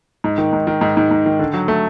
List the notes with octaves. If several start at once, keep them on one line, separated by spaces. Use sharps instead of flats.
G#2
D#3
G#2
D#3
G#2
G#2
G#2
D#3
D3
F#3
A3